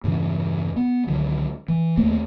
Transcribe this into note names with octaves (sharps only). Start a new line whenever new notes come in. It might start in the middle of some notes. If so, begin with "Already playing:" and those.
E2 G2 C#3 E3
B3
C#2 D3 D#3 F#3
E3
D#2 A3 A#3 C4